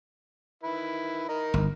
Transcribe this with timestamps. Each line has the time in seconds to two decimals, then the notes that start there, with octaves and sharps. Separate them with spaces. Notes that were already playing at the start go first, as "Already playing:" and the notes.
0.63 D#3 E4 B4
1.29 D#3 A#4 D#5
1.54 G1